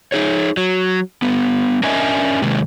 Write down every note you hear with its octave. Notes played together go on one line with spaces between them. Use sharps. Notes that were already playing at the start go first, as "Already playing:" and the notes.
D#4 G#4 C#5
F#3
G3 B3
C#4 D4 A#4 D#5 E5 G#5
C3 D#3 G#3